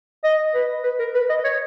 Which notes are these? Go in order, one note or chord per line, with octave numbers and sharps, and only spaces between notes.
D#5
B4
B4
A#4
B4
D#5
C#5